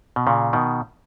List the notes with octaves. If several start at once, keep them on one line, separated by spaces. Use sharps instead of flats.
B2
A#2 C#3
B2 D#3